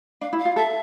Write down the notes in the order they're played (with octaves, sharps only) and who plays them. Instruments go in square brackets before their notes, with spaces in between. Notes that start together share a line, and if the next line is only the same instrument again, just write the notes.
[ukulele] D4 [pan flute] F5
[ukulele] E4
[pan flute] F5
[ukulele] F4
[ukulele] A4 [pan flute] E5